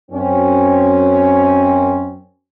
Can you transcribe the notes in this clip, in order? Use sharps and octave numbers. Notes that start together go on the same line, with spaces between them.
F#2 C4 C#4